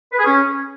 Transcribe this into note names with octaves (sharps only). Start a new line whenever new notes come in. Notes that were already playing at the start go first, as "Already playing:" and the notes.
B4
G#4
C#4